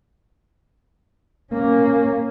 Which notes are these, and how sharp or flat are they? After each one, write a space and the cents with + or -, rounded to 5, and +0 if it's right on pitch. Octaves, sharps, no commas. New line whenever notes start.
A#3 +0 C#4 +0